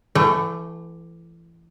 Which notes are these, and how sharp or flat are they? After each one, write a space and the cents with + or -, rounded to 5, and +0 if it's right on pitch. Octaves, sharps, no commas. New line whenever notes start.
E3 +30 A3 +0 G5 -35